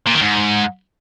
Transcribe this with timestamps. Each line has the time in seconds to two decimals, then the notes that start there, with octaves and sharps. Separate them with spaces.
0.07 A#2
0.14 D#3
0.22 G#2